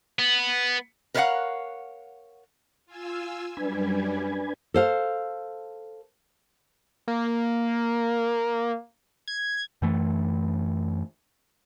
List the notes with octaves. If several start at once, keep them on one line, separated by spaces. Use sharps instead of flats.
B3
A#4 B4 C#5 D5 F5 F#5
F4 G#5 E6
F#2 G3 D4 B4 G#5
A4 C5 F5
A#3
G#6
F#2 E3 A3